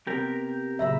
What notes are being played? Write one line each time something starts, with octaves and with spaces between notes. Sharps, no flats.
C3 B3 G4 A#4
F#2 A#2 C#3 E5 A#5 B5